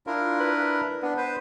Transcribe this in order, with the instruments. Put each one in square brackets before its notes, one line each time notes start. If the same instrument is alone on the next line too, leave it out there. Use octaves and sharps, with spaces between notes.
[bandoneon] D4 E4 A#4 [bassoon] F4
[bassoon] B4
[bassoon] B3 [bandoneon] D4
[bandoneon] B4 C5